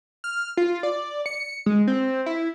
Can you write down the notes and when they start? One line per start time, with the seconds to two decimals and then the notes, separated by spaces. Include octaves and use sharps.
0.24 F6
0.57 F4
0.83 D5
1.26 C#7
1.66 G#3
1.87 C4
2.26 E4